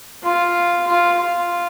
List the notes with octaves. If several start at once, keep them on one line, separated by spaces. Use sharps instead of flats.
F4
F4
F4